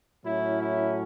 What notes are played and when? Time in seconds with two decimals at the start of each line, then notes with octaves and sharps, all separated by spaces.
0.25 A2 F#3 C#4 E4
0.61 E4